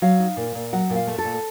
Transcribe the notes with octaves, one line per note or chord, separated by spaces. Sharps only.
F#3 F5
D#4
A#2
A#2
F#3 F#5
A#2
F5
A3
A4
A#2